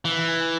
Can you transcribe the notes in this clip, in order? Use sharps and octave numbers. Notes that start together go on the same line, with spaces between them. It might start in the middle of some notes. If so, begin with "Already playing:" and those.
E3